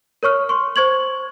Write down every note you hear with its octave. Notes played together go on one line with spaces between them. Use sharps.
A#4 C#5 C#6 F6
C6 C#6
C5 C#6 G#6 F#7